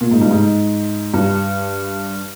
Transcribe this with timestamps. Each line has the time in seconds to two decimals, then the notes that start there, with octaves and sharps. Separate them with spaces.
0.01 A#2
0.11 G#2
0.21 G2
0.31 G#2
1.14 G2